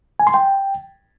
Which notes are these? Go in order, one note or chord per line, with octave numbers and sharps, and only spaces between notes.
G#5
C6
G5